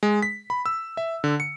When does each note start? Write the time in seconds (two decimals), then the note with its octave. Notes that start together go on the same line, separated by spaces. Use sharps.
0.03 G#3
0.22 B6
0.50 B5
0.66 E6
0.97 E5
1.24 D3
1.40 C#7